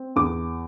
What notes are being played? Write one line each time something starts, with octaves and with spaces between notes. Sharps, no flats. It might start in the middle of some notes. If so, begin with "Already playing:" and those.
Already playing: C4
E2 D6